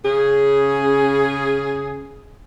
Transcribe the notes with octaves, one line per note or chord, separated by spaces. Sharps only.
C#3 G#4